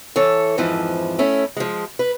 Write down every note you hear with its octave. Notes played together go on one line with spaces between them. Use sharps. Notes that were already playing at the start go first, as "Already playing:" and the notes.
E3 A4 C#5
F2 G#2 E3 F3
A3 C#4 E4
F3 G#3
B4